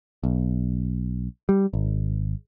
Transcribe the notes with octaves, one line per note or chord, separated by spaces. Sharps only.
B1
G3
G#1